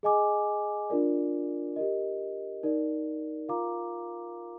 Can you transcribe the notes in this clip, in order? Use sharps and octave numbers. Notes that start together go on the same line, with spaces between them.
G#4 D#5 G#5 D6
D4 F4 A#4 D5
G4 A#4 D#5
D#4 A#4 D5
F4 A#4 F5 A#5 D6